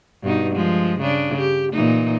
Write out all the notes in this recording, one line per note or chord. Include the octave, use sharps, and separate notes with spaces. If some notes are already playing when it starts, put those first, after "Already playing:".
G2 B2 D#4
F3 G#3
C#3 D4
G4
A#2 E3 D#4